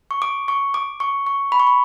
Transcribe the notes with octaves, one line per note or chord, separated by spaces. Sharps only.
C#6
D6
C#6
D6
C#6
C#6
B5
C#6
B5